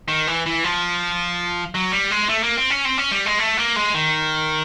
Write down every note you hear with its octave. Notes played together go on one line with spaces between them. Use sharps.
D#3
E3
E3
F3
F#3
G3
G#3
A3
A#3
C4
C#4
C4
C#4
G3
G#3
A3
A#3
G#3
D#3